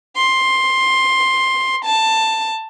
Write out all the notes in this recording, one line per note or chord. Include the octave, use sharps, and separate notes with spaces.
C6
A5